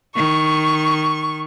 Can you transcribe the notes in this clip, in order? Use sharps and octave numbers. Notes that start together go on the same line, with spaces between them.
D#3 C#6